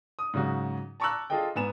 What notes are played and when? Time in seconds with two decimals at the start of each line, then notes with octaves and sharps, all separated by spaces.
0.19 D#6
0.34 G#2 C#3 F#3 F#4
1.00 A5 A#5 C#6 D6 E6 F#6
1.30 F4 G#4 A4 D#5 G5
1.55 G#2 B3 G#5 E7